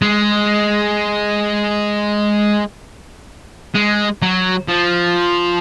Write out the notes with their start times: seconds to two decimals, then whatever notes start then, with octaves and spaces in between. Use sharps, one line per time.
0.02 G#3
3.75 G#3
4.22 F#3
4.68 F3